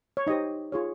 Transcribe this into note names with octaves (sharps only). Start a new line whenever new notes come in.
C#5
D#4 G4 C5 D#5
F4 G#4 C#5